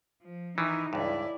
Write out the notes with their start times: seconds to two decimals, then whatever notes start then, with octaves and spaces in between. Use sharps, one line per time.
0.22 F3
0.58 D#3 E3 D#4 E4
0.93 C#2 G2 E4 D5